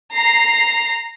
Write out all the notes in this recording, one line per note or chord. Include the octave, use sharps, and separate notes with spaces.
A#5 C7